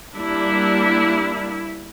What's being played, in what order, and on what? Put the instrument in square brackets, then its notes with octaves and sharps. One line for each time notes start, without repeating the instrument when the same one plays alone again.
[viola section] G3 A#3 D4 E4